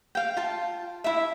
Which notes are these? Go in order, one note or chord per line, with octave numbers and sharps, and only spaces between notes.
F5 G5
F4 A5
E4 E5